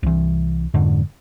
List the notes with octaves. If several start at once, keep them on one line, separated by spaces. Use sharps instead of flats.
C2 E3
F2 G#2 D3